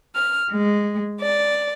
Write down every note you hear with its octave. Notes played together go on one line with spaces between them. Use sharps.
F6
G#3
D5